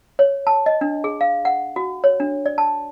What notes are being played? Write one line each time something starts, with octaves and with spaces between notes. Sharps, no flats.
C#5
A5
D#5
D4
G#4
F5
F#5
F#4
C#5
D4
D5
A5